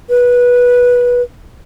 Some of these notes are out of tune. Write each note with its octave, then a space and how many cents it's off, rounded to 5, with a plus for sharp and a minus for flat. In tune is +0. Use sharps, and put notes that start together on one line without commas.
B4 -15